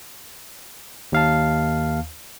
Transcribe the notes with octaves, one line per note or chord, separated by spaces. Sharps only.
D#2 F5 A5